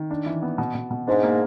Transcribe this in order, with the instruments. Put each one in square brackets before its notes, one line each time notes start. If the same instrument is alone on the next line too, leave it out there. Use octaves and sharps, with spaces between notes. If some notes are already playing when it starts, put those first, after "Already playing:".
Already playing: [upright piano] D#3
D4
E3
B3
B2
B2
B2
[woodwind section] G#2 [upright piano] D4
[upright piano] A#3